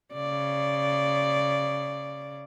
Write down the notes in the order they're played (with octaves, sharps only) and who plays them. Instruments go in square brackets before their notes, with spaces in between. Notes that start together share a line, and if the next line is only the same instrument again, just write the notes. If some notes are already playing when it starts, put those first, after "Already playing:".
[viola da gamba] C#3 D5